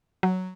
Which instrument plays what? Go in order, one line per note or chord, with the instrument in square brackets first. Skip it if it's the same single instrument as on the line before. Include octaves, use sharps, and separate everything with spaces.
[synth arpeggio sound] F#3